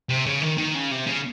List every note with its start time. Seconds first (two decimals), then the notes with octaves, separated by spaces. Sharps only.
0.09 C3
0.26 C#3
0.42 D#3
0.58 D#3
0.74 C#3
0.91 C3
1.06 C#3